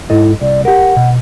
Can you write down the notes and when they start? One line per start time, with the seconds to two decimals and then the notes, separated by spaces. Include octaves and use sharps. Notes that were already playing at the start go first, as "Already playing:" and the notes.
0.10 G#2 E4 A4 D#5
0.41 C2 D5
0.65 G4 A#4 F#5
0.96 B2